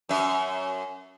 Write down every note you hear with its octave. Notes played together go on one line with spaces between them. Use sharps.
F#2 E5